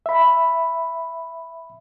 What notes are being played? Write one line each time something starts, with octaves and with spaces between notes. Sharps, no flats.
E5 B5